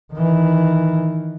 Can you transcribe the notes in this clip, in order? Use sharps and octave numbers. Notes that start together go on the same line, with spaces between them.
D#3 E3